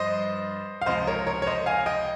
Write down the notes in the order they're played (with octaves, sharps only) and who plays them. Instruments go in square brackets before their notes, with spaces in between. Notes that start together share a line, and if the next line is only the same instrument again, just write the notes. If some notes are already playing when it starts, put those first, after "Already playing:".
Already playing: [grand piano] G2 F3 C5 D#5
F5
C#2 C3 F3 C5 D#5
A#4 C#5
A#4 C#5
C#5
C5 D#5
F5 G#5
D#5 G5